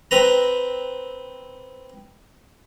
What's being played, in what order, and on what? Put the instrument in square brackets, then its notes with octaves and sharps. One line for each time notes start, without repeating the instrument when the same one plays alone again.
[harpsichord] C4 B4 A#5